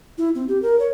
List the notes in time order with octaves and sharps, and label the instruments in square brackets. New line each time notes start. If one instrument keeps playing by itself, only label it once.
[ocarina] E4
C4
G4
A#4
C#5